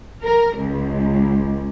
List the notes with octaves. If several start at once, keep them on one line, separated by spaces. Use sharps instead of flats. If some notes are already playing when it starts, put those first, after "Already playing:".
A#4
C#2